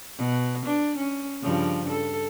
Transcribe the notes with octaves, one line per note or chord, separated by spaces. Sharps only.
B2
D4
C#4
G2 C#3 F3
A4